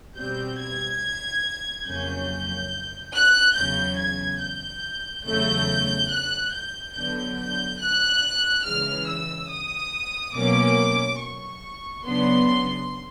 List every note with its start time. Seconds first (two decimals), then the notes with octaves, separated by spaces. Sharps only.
0.17 B2 G3 C4 G6
0.59 G#6
1.86 F2 C#3 F#3 A#3 C#4 G6
3.14 F#6
3.56 E2 C#3 F#3 G6
3.98 G#6
4.40 G6
5.26 E2 C#3 F#3 A3 G6
6.11 F#6
6.53 G6
6.95 D3 F#3 B3 D4 G6
7.38 G6
7.80 F#6
8.65 C#3 E3 G#3 F6
9.08 E6
9.50 D#6
10.35 B2 F#3 A#3 C#4 D6
11.20 C#6
12.05 C#3 F#3 B3 D4 C6